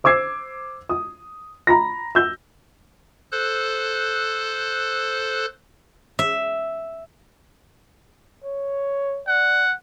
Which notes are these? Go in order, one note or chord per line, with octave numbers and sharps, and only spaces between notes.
C5 D6 E6 G#6 C7
D#6
A#5 B5 A#6
E6 G6
A4 C5 F#6
E5
C#5
D5 F#5